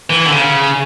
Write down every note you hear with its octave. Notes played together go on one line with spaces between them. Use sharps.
E3
D3
C#3